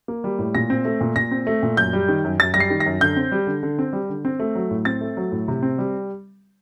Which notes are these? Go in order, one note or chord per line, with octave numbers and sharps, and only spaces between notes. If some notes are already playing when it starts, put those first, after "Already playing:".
A#3
G3
A2
A#2 A#6
C4
A3
A#2
A#2 A#6
C4
A3
A#2
F#2 G6
G3
D#3
F#2
F#2 A6
G3 A#6
C7
D#3
A#6
F#2
D3 G6
C4
G3
D3
D3
C4
G3
D3
C4
A3
F#3
A2
C4 A6
A3
F#3
A2
C3
C4
G3